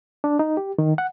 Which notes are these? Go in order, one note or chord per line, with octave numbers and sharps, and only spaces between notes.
D4
D#4
G4
D#3
F#5